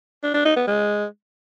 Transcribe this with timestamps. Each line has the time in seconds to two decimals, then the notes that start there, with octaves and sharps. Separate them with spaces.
0.23 D4
0.34 D4
0.45 D#4
0.56 B3
0.67 G#3